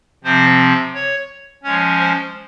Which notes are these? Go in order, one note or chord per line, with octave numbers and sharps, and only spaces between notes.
C3 F3 C4 C5
C#5
F3 G#3 C#4 C#5
C5